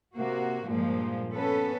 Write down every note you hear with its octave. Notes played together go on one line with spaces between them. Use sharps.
C3 A#3 F#4
G2 A#2 F3 G#3
B3 C#4 A4 B4